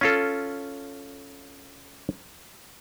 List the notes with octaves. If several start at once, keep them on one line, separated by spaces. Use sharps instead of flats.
C#4 F4 A4